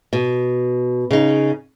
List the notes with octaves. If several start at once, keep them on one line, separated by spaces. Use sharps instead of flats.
B2
C#3 D#4